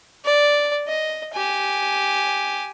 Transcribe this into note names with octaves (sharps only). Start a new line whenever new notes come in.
D5
D#5
G4 G#5